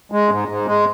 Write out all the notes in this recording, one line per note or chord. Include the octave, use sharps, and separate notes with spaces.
G#3
G#2
G#2
G#3